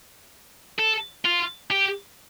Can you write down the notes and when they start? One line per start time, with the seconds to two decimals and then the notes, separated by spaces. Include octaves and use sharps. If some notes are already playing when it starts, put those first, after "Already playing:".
0.78 A4
1.25 F4
1.71 G4